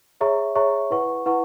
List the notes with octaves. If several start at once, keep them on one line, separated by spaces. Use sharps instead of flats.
G#4 C#5 E5 A#5 C#6
G#4 C#5 E5 A#5 C#6
E4 B4 F#5 C#6
E4 B4 F#5 C#6